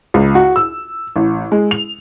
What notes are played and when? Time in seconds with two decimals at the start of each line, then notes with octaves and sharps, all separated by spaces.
0.14 C#2
0.35 F#4
0.56 E6
1.16 A1
1.52 G#3
1.71 F7